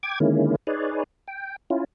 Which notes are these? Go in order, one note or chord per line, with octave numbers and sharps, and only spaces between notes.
G5 D6 G#6
D3 D#3 G#3 A#3 C#4 E4
D#4 G#4 B4 C#5 D5
G5
C#4 E4 F4